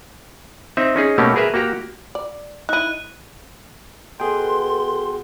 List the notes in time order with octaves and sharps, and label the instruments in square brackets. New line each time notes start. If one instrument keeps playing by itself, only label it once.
[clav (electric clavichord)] C4 D#4 E5
C#4 D#4 G#4
B2 A3 A#3 C#4 G4
G#4 A#4 B4 E5
A#3 F#4 G4 A#5
[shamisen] D5
[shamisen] D#4 E4 [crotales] F#6 D#7
[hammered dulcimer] B2 [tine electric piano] G#4 G5 [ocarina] A4 [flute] C6